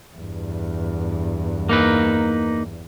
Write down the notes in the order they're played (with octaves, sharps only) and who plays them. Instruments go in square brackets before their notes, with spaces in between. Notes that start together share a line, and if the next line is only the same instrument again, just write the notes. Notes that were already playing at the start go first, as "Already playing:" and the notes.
[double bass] E2 G2
[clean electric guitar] A#3 D#4 B4